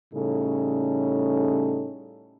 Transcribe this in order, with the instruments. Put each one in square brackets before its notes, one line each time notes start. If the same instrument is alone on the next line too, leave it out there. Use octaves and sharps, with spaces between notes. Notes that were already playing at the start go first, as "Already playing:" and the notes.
[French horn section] A2 C#3 G3 C#4 D#4 A4